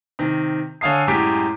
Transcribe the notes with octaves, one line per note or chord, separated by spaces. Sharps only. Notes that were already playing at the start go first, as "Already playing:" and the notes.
C3 D#3
D3 C#5 F5 G#5 D#6 C7
F#2 A2 G#3 G4 D6 B6